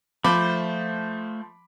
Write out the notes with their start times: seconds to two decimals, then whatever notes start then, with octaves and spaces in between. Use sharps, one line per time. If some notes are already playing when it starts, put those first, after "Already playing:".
0.24 F3 A3 C5 B5 D6